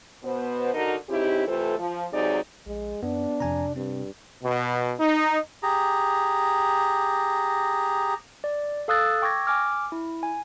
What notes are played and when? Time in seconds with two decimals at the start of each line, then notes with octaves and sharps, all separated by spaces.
0.24 B2 B3 C5
0.74 D3 D#4 F#4 A#4
1.09 C#3 C4 D#4 E4 G4
1.47 C3 E3 A3 F4 A4 C5
1.78 F3
2.13 G#2 C3 F#3 D#4 G#4 D5
2.67 A#1 G#3
3.03 F#2 B3 D4
3.40 F2 C3 G#5 A#5
3.76 G2 C4
4.44 B2
5.00 D#4
5.63 G4 G#4 A#5
8.44 D5
8.88 A4 F5 D#6 E6 F#6 A6
9.22 G5 C#6 D6 E6 G#6 A#6
9.47 G#5 D6 F6
9.92 E4
10.23 G#5